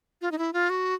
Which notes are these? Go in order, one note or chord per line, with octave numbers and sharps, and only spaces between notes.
F4
D#4
E4
F4
F#4